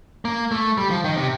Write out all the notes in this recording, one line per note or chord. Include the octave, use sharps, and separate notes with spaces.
A#3
A3
G3
F3
D#3
C3